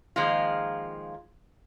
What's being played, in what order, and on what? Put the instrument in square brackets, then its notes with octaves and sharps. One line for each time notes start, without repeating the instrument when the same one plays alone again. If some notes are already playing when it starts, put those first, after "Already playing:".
[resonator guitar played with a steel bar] D#3 F3 G#3 A#3 F4